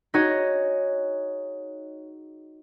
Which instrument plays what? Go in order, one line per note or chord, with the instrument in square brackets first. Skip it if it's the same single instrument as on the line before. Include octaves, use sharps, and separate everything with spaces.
[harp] D#4 F#4 G#4 C#5 D#5